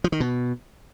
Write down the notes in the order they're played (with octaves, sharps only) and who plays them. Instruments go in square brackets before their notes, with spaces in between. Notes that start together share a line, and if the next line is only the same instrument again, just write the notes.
[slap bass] F3
D#3
B2